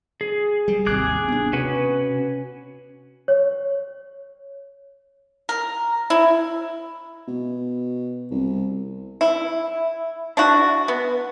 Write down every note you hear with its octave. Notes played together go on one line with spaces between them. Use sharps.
G#4
G3
G#1 D#2 C3 G#4 D6 F#6
B3 D4
C3 C#4 F#4 B4
C#5
A#4
E4
B2
C2
E4
D4 E4 F#4
B3